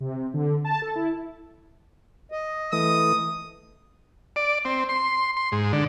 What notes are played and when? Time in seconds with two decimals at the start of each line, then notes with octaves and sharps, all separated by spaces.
0.01 C3
0.34 D3
0.65 A5
0.82 A4
0.96 E4
2.32 D#5
2.73 E3 A3 D#6
4.36 D5
4.65 C4
4.89 C6
5.37 C6
5.52 G#2
5.73 D3